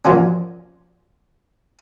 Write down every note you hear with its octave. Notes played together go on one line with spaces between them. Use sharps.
A#2 F3 F#3 C#4